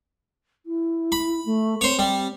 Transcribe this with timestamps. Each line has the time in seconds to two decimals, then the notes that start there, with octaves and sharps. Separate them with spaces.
0.66 E4
1.12 B5
1.45 A3
1.81 C4 C5 C#5
1.99 G3